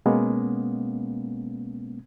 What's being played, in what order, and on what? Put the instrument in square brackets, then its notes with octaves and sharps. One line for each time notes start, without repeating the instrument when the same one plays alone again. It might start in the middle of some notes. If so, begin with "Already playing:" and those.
[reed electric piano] B2 G#3 A#3 B3 C#4